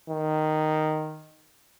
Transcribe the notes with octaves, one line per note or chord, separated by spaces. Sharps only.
D#3